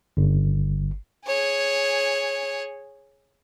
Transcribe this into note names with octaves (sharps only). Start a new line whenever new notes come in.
G1
G#4 C#5